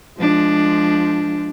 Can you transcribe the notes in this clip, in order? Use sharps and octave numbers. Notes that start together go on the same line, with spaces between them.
F3 G#3 D4